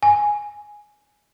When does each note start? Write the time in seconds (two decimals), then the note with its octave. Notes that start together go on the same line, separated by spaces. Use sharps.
0.03 G#5